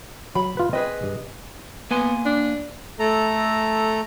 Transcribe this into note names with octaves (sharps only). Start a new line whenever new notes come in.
F#3 B5
F4 B4
C4 G#4 B4 D#5
G2
A#3 B3 G#5 C6
D4
A3 A4 A#5